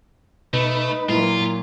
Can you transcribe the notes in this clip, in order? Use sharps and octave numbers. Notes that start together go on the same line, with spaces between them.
B2 A3 D#4 B4
A#2 F#3 E4 F4